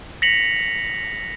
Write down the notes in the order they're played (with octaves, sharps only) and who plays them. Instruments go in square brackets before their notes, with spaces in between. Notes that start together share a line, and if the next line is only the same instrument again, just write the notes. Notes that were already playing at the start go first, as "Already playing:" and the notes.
[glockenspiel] A#6 B6 C#7 F7 F#7